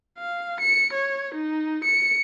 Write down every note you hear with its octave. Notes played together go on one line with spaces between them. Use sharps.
F5
C#7
C#5
D#4
C#7